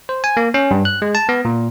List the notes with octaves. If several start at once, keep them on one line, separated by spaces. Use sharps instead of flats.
C5
G#5
A#3
C#4
G2
F#6
G#3
A5
B3
A#2